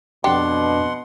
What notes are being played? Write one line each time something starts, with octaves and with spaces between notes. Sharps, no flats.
F2 B2 D4 G4 F#5 C6 D6